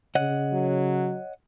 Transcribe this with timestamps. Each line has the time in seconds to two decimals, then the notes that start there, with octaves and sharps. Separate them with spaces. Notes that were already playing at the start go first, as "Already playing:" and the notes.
0.15 C#3 C#5 D#5 F#5
0.53 F#3